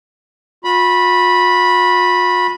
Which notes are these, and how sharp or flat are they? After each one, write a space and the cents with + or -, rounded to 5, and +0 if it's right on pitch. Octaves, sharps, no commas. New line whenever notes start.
F4 +45 B5 -10